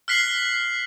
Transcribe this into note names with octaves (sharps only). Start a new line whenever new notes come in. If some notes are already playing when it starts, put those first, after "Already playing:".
F6 F#6 B6 C7 F#7